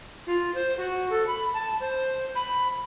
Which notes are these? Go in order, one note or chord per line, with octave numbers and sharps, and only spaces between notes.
F4
C5
F#4
A4
B5
A5
C5
B5